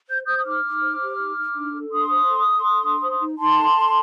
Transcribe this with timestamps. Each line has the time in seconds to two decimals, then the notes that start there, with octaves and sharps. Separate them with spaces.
0.09 C5 G6
0.25 C5 D#6 G6
0.38 D#6
0.45 D#4 D6 F6
0.64 D#4
0.82 C5
1.01 G4
1.19 D#4
1.37 D#4
1.55 D4
1.74 A4
1.92 D4 C6 D#6
2.10 C5
2.29 A4
2.47 A4
2.65 A4
2.84 D4
3.02 C5
3.20 D#4
3.38 D#4 A5 C6
3.57 A4
3.75 A4